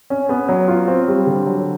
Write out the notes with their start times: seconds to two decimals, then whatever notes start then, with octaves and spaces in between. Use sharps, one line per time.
0.10 C#4
0.29 B3
0.49 F#3
0.68 F4
0.88 C4
1.08 G3
1.27 D3
1.47 F#3